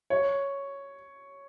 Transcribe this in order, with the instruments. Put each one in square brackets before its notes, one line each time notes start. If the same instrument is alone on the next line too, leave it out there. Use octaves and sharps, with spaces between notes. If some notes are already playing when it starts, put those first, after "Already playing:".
[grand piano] C#5